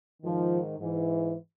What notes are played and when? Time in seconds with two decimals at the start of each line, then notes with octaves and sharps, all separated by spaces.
0.22 G#2 D#3 F3
0.80 G#2 E3